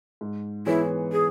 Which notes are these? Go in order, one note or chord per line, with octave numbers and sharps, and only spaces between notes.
G#2
E3 B3 E4 G#4 C#5
G#4